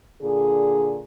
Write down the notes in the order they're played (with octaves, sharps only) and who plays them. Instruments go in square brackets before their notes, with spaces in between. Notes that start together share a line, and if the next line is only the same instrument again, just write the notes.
[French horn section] A#2 D3 G#4